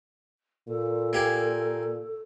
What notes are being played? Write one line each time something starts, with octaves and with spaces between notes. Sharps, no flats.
A#2 A4
A#3 G4 G#4